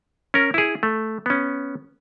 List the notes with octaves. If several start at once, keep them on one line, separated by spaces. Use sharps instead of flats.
C#4 A#4
E4 G#4
A3
B3 C#4